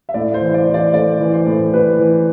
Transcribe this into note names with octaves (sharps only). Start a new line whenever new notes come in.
E5
A2 D5
C5
E3
D5
E3 C5
D5
A3 D5
E3
C5
A2
A2 B4
E3